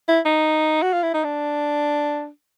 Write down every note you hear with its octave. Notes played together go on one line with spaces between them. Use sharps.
E4
D#4
F#4
F4
E4
D#4
D4